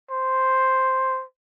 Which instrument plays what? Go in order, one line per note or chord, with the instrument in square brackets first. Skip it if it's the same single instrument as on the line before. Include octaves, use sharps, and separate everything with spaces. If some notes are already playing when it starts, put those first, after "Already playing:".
[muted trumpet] C5